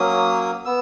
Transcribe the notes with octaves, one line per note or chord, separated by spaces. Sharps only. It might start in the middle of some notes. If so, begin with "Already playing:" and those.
Already playing: F#3 A#3 C#4 D#6
B3 E6